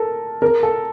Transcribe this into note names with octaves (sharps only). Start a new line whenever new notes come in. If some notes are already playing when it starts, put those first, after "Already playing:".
Already playing: A4 A#4
A#4
A4